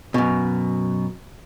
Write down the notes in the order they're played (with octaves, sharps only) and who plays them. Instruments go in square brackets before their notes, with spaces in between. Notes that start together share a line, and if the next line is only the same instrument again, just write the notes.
[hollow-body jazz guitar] F#2 B2